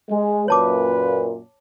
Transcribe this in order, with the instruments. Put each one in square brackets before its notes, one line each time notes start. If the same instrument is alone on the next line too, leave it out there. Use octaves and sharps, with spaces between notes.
[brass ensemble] G#3
[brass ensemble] F#2 A#2 [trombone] B4 [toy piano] C#5 A5 D6